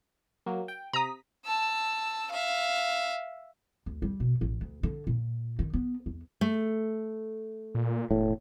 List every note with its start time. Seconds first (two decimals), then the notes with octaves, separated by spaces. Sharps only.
0.46 F#3 A#3
0.68 G5
0.93 C3 A#5 D#6 B6
1.45 A5 E6
2.31 E5 F5
3.86 D2
4.02 G3
4.20 B2
4.41 A1
4.61 D2
4.83 D3
5.07 A#2
5.59 D#3
5.73 B3
6.06 E2
6.41 A3
7.75 A#2
8.11 E1 A2